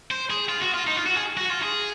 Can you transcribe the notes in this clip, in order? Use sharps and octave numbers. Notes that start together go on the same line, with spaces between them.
C5
G#4
F4
F#4
F4
D#4
F4
F#4
G#4
F#4
F4
G#4